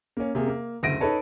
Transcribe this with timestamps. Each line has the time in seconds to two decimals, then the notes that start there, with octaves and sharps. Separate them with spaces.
0.17 A#3 C#4
0.35 C3 A#3 G#4
0.47 A#3
0.83 F#1 D2 E5 A#6 D7 D#7
1.00 D#4 A4 B4 C#5 A5